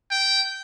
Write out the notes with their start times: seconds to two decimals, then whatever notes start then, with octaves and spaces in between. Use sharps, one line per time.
0.11 G5